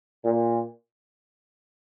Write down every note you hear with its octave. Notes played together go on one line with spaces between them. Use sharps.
A#2